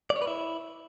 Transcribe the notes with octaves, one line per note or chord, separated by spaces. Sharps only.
D5
C#5
B4
E4